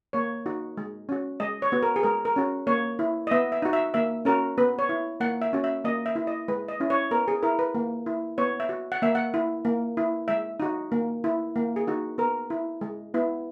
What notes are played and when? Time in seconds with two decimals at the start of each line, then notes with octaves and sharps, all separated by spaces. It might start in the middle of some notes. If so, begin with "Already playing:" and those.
0.13 A#3 C#5
0.46 D#4 F#4
0.77 G#3
1.09 C#4 F#4
1.40 G#3 D#5
1.62 C#5
1.72 B3 F#4
1.83 A#4
1.96 G#4
2.03 G#3 A#4
2.25 A#4
2.36 C#4 F#4
2.67 A#3 C#5
2.99 E4
3.27 D#5
3.31 B3 E5
3.52 E5
3.62 D#4 F#4
3.73 E5
3.94 A#3 E5
4.25 C#4 F#4 A#4
4.58 B3 B4
4.79 C#5
4.89 E4
5.20 A#3 F#5
5.42 E5
5.53 C#4 F#4
5.64 E5
5.84 A#3 D#5
6.06 E5
6.16 E4
6.27 D#5
6.48 G#3 B4
6.68 D#5
6.80 C#4 E4
6.90 C#5
7.11 B3 A#4
7.28 G#4
7.43 E4 A#4
7.59 B4
7.75 A#3
8.06 E4
8.38 B3 C#5
8.60 E5
8.69 F#4
8.92 F#5
9.02 A#3 E5
9.15 F#5
9.34 E4
9.65 A#3
9.97 E4
10.28 G#3 E5
10.60 D#4 F#4
10.92 A#3
11.24 E4
11.56 A#3
11.76 G#4
11.87 D#4 F#4
12.18 B3 A#4
12.50 E4
12.81 G#3
13.14 B3 E4